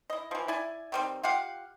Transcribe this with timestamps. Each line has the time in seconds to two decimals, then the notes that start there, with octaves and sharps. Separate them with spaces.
0.10 E4 D#5
0.31 E3 F3
0.48 E4 D5 G#5
0.92 D#3 G3 C4
1.23 F4 G4 F5 F#5